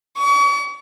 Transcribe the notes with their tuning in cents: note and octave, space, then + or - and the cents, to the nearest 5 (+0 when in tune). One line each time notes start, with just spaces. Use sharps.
C#6 +40